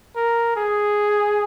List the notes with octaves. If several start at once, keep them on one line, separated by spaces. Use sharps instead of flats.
A#4
G#4